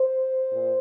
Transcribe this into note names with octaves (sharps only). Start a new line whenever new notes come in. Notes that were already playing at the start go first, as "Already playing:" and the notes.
Already playing: C5
A#2